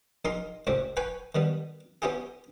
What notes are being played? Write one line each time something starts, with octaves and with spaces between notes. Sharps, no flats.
A#1 D#4 A#4 C6
C#2 A2 C3 C4
B4 G5 G#5 B5 C#6
D#3 G3 B3
B3 C#4 E4 G4 G#4